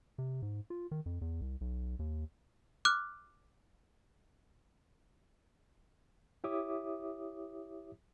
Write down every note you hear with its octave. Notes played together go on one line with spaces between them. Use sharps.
C3
G#2
F4
D#3
F2
E2
C2
B1
D#2
D6 F6 F#6
E4 G4 C#5 E5 D6 D#6